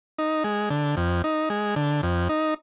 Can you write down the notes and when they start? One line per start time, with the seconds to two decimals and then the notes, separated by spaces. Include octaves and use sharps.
0.19 D#4
0.44 G#3
0.70 D3
0.97 F2
1.24 D#4
1.50 G#3
1.76 D3
2.03 F2
2.29 D#4